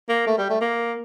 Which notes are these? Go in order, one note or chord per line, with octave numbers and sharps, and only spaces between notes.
A#3
A3
G3
A3
A#3